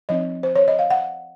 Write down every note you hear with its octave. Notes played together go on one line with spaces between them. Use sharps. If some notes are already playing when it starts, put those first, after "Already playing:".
F3 C4 D#4 D#5
C5
C#5
D#5
F5
F#5